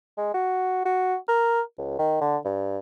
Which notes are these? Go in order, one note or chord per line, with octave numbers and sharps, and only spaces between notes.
G#3
F#4
F#4
A#4
C#2
D#3
D3
G2